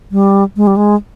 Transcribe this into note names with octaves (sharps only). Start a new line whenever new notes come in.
G3
G#3
G3
G#3